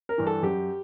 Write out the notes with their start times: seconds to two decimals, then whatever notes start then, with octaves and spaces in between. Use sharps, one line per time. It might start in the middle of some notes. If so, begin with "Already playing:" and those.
0.09 A#4
0.18 G2 E3
0.27 A4
0.43 F#2 G4